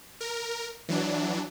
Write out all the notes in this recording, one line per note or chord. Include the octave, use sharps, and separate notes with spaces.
A#4
E3 F#3 D4